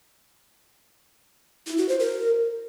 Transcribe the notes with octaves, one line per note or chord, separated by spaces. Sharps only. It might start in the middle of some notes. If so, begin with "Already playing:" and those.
E4
F#4
C5
A#4